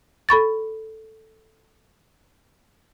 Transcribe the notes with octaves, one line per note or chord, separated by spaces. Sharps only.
A4 B5 C#6 A6